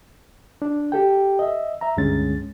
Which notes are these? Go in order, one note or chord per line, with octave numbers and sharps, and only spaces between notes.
D4
G4 A4 G5
D#5 E5
E5 A#5
C#2 G2 D3 G#3 C#4 A6